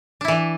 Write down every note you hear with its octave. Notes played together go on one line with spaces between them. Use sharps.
E3 D4 E4